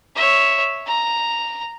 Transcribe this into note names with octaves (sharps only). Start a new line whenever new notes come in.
C#5 E5
A#5